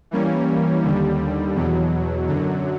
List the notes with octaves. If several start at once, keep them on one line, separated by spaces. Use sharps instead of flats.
E3 G3 A#3 C#4
D#2 D3 G3
E2 B2 F#3
F#2 D3 F#3